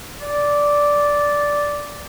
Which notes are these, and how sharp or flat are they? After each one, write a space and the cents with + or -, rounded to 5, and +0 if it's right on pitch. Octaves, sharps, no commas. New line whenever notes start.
D5 -10